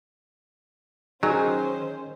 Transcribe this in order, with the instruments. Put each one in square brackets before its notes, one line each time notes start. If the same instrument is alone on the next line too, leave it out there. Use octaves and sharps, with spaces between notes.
[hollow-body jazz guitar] D#3 D#4 [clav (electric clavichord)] F#3 [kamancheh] C#4 C5 [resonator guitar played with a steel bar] G#4